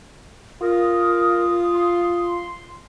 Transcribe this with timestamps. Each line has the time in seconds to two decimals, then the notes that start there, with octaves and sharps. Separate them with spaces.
0.62 F4 A#4 D#6
1.75 C6